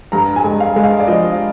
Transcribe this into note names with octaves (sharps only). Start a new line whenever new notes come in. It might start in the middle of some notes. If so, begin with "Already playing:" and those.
G2 A#5
G#5
G#3
F5
G#3
F5
D5
F3 D#5